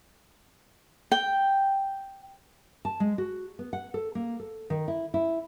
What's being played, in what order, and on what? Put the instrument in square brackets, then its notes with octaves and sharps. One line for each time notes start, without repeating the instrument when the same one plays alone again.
[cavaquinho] G5
[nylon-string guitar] A5
G#3
F#4
B3
F#5
A4
A#3
A4
D#3
E4
E4